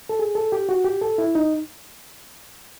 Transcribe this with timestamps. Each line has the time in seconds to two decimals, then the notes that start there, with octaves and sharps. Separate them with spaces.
0.09 A4
0.19 G#4
0.35 A4
0.52 G4
0.69 F#4
0.85 G4
1.01 A4
1.18 E4
1.35 D#4